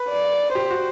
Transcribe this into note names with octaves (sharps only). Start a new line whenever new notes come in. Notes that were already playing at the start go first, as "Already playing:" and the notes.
Already playing: B4
D5
G4 C5
F#4